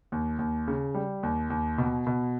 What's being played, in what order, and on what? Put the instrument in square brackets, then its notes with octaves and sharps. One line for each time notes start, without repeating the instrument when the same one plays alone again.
[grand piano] D#2
D#2
C#3
G3
D#2
D#2
B2
B2